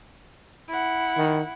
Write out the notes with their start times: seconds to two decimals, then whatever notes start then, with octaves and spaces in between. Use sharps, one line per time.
0.70 E4 F#5
1.18 D#3